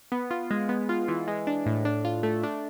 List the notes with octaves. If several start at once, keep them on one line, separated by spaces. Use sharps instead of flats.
B3
F4
G#3
B3
F4
E3
G#3
D4
A2
D4
F4
A3
D4